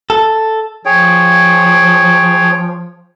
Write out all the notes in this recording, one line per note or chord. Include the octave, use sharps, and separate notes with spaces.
A4
F3 G#4 C#5 G5